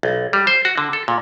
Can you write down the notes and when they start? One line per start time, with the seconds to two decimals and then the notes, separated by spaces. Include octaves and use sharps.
0.03 B1
0.33 G3
0.47 C5
0.65 F#4
0.78 D3
0.93 A4
1.08 A#2